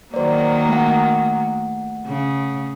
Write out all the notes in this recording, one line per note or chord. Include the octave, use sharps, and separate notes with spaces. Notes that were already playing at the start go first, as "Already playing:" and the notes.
D#3 F#3 A#3 C5 D5
A3 F#5
C#3